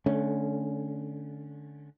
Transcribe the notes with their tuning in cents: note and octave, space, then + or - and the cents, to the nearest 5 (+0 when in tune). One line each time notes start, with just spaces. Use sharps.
D3 +0 A3 -30 C#4 +0